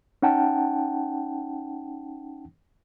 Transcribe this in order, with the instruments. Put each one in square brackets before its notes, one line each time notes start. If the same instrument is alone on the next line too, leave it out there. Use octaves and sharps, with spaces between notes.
[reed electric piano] C#4 D#4 F#5 G5 A5